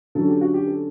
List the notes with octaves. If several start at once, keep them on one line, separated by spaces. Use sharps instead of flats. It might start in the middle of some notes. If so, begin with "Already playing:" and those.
D3 F#3 C#4 A4
G4
F#4
G4
A4